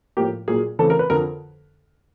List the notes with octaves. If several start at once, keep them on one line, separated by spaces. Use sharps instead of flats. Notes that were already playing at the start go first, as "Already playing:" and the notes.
A2 F3 A#3 G4
A#2 F#3 A#3 G#4
C#3 E3 A3 C4 A4
A#4
B4
F2 D3 F3 A#4